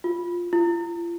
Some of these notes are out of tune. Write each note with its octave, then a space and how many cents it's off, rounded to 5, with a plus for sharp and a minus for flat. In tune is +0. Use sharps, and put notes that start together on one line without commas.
F4 +5
F4 -40